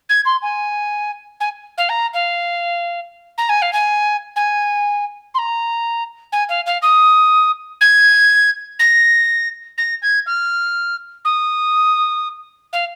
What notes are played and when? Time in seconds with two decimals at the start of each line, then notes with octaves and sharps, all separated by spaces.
0.09 G#6
0.25 C6
0.42 G#5
1.40 G#5
1.78 F5
1.89 A#5
2.14 F5
3.38 A#5
3.49 G#5
3.62 F5
3.73 G#5
4.36 G#5
5.34 C6
5.38 A#5
6.32 G#5
6.49 F5
6.66 F5
6.82 D#6
7.81 G#6
8.79 A#6
9.78 A#6
10.02 G#6
10.26 F6
11.25 D#6
12.73 F5